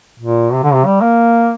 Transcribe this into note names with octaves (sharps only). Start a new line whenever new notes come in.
A#2
C3
D3
C3
G3
A#3